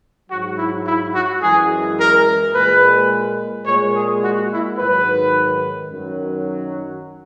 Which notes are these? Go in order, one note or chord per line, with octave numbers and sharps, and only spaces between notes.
G#2 F#3 F#4
E4
E4
F#4
F#2 E3 G#3 G#4
A#4
A#2 G#3 B4
A#2 G#3 C#5
G#4
F#4
E4
G#2 D#3 F#3 B4
F#2 D#3 F#3